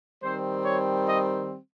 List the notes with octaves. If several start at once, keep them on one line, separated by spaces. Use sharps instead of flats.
D#3 G3 C4 C5
C#5
D#5